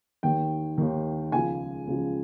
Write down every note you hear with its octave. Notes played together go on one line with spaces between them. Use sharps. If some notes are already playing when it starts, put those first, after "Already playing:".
D#2 D#3 G5
D#2 D#3
C#2 C#3 F3 G#5
C#2 C#3 F3